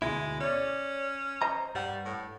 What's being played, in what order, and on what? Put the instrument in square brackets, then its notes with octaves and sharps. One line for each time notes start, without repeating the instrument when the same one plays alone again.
[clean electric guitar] D2 B2 E4 [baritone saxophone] G#3
[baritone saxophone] C#4 [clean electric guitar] C#5 D5
[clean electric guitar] C5 D#5 A#5
[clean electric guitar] G2 F#5 [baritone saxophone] G3
[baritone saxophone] A2